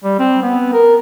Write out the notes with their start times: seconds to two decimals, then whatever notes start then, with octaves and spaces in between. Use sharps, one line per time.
0.04 G3
0.19 C4
0.43 B3
0.73 A#4